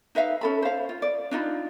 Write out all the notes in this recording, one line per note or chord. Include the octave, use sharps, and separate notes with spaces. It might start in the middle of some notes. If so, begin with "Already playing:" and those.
D#4 B4 E5 F5
C#4 A4 B5
C5 F5
F4
D5
D4 D#4 F4 B5